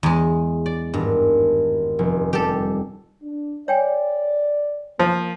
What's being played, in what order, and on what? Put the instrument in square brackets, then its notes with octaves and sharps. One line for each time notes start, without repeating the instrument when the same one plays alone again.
[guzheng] E2 G#3
D5
[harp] G#1 [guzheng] G2
[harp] F1
[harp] G3 [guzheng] G4 A4
[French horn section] D4
[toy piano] C#5 G5 G#5 [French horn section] D5
[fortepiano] F3 [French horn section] A#3